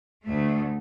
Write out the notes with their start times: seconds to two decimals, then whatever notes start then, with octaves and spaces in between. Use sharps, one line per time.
0.25 D2 A3